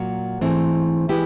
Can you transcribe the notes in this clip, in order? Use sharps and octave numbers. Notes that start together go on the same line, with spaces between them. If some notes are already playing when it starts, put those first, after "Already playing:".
Already playing: A#2 F#3 A#3
G#2 E3 A3 C4
E3 G#3 B3 E4 G4